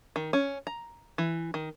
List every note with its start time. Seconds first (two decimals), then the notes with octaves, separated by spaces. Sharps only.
0.16 D#3
0.33 C#4
0.67 A#5
1.18 E3
1.54 D#3